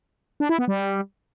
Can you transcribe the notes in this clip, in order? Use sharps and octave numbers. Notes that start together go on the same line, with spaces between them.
D4
E4
B3
G3